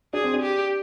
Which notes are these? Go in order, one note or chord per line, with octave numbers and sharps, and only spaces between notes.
D4 G#4
C4
D4
G4